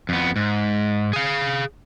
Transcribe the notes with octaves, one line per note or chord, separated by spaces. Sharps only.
F2 B3
G#2
G#4 F5